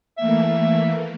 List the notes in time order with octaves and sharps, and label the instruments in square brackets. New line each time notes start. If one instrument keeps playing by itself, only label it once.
[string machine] E3 A3 A#3 [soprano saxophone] E5